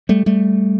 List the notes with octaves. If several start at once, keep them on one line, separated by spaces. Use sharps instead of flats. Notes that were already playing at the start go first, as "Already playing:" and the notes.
G3 A3
G3 A3